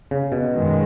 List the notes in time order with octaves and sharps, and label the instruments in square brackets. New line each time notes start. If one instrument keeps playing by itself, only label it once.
[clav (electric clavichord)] C#3
B2
[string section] F#2 D#3 G#3